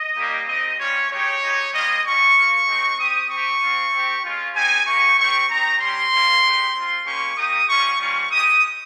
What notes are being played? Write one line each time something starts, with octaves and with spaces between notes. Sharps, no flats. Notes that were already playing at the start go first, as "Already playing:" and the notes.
Already playing: D#5
G3 A#3 D#4 G4
C4 D#4 G4 D#5
G3 C#4 F4 C#5
G#3 D#4 G4 C#5
G#3 D#4 G4
G3 A#3 F4 D#5
G3 C#4 F4 C#6
A#3 F4
G#3 C4 D#4
C4 G4 D#6
C4 G4 C#6
C4 F4
C4
G4
G#3 C#4 F4
C4 D#4 G4 G#5
A#3 D#4 G4 C#6
G3 C4 G4 C#6
C4 D#4 G4 A#5
G3 C#4 G4 C6
A#3 C#4 F4
G#3 D#4 G4
C4 F4
A#3 C#4 G4 C#6
A#3 D#4 G4 D#6
G3 C#4 F4 C#6
G3 A#3 C#4 F4 C#6
G#3 D#4 G4 D#6